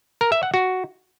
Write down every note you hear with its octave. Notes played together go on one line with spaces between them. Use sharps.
A#4
E5
F#5
F#4